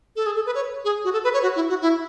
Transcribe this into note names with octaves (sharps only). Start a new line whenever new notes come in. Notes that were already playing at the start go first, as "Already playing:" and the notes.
A4
G#4
A4
B4
C#5
G#4
F#4
A4
B4
C#5
F#4
E4
F#4
E4